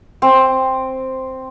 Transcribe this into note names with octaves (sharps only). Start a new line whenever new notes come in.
C4